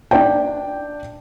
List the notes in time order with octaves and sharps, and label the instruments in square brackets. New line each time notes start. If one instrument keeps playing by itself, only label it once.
[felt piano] D4 D5 G5